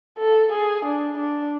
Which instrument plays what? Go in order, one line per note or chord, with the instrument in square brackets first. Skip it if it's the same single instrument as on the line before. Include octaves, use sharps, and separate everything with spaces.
[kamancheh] A4
G#4
D4
D4